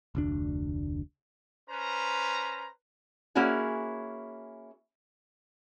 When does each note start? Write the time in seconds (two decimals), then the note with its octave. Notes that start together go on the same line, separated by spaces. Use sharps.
0.15 F1 D2 D4
1.69 C#4 B4 C5 A#5
3.35 A#3 C#4 E4 F#4 G#4